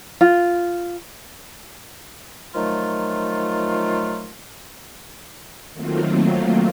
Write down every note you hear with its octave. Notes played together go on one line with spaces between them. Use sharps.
F4
D#3 F3 F#3 A3 F4
D#3 F#3 A3 A#3 C4 F4